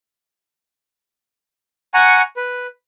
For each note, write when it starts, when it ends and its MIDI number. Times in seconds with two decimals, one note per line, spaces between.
1.94 2.22 78
1.94 2.22 80
1.94 2.22 82
1.94 2.22 85
2.37 2.67 71